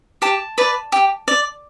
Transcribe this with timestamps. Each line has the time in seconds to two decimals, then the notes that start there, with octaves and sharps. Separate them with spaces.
0.22 G4 A5
0.58 B4 D5
0.92 G4
1.28 D5